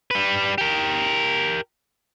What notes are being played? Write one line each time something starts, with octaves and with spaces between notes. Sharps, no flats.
G3 B4
G4 A#4